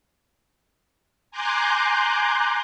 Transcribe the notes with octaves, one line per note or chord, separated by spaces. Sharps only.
G#5 A#5 C6 D6 F#6 G6